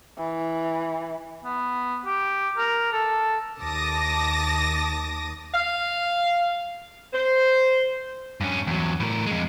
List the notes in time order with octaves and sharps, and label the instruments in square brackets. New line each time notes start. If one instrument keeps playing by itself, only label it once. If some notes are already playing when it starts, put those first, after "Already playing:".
[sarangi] E3
[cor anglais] B3
G4
A#4
A4
[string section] D#2 A5 D6 D#6 A#6
[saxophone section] F5
C5
[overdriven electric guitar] G2 C#4
E2 F#3
A2 A#4
F2 G#3